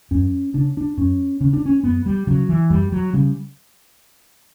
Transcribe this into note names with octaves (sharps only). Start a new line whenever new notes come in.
F#2 C#4
C#3 D4
D4
F#2 C#4
C#3 C#4
D4
C#4
F#2 B3
G3
C#3 F#3
E3
F#2 G3
F#3
C#3 G3